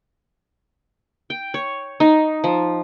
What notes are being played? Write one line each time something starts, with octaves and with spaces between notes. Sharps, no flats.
G5
C#5
D#4
F3